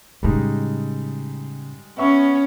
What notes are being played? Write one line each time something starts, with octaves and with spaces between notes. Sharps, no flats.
A2 C#3 G3 G#3 D#4
B3 C#4 E5 C#6